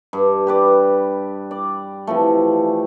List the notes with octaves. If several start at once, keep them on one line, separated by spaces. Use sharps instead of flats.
G2
G4 B4 D5
D5
C3 E3 F3 A3